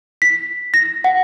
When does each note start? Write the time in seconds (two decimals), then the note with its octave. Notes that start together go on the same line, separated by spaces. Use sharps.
0.22 B6
0.74 A#6
1.04 F#5